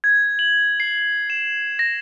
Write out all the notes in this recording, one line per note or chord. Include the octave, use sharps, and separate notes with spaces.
G#6
F#7
C7
E7
A#6